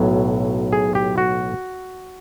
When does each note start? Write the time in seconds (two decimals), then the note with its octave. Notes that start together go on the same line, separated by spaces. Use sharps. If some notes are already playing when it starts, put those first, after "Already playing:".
Already playing: B1 A2 F#3
0.73 G#4
0.95 G4
1.18 F#4